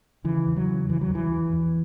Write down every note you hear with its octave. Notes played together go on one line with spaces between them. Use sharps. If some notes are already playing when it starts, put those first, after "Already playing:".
C#3 E3
E2
F#3
C#3
E2 E3
F#3
E2 E3
E2
E2